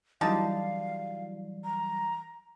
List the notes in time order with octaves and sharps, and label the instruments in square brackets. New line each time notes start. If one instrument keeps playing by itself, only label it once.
[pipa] D3 D#4 A5 [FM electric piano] E3 F#3 G3 [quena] F5
[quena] A#5